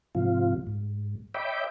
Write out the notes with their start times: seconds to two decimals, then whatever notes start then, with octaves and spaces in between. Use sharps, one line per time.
0.15 G#2 C3 F3 F4
0.67 G#2
1.34 C#5 D#5 E5 G5 B5 D6